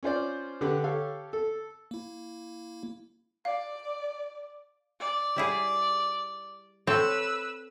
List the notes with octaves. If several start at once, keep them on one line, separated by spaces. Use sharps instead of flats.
C#4 F4 C5 D5
D3 G4 B4
G4 A4 C#5 F5
A4
A#3 E4
D5 F5
D5
G3 E4 G#4
C4 A4 B4 C#5 E6